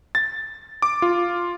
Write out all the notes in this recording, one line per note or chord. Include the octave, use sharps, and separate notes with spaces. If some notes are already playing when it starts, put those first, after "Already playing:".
A6
D6
F4